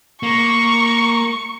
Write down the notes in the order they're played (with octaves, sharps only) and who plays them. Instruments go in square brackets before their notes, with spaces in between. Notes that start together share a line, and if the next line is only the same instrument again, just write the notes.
[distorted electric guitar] A#3 [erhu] C#6